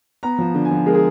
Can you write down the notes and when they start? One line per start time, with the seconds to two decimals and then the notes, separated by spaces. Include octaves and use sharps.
0.23 B3 A#5
0.39 F3
0.55 D3
0.65 G#5
0.71 F3
0.86 G#3 A#4
0.94 G#4